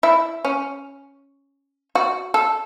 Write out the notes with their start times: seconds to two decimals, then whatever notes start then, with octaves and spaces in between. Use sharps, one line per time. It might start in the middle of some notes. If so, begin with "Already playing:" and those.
0.03 E4
0.45 C#4
1.95 F#4
2.34 A4